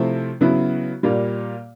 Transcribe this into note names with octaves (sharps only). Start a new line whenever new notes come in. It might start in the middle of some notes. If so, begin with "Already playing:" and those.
Already playing: C3 F3 A3 C4 E4
C#3 F#3 B3 E4
A#2 G3 A#3